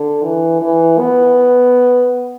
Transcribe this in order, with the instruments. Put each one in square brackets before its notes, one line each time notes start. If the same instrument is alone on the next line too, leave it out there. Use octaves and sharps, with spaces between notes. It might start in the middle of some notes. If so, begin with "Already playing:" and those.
Already playing: [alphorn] D3
E3
E3
B3